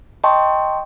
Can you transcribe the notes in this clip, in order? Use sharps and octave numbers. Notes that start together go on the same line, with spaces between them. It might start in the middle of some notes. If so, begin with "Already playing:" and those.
D#5 G5 A5 C6 C#6